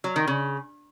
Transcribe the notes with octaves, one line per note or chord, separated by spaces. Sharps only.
F#3
D#3
C#3